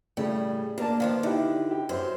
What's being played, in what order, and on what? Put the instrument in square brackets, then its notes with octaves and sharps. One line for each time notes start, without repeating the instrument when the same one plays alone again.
[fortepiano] A2 C#3 [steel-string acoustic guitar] G3
[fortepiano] A#3 A#4 A5 [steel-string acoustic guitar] D4
[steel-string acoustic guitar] D#3 F3 B3
[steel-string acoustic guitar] D3 [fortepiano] D#4 E4 G4
[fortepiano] G4
[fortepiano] F#2 [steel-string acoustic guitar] C5